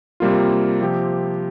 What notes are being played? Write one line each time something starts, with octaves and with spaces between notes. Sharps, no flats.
C3 G3 A#3 F4
C3 F3 C4 G4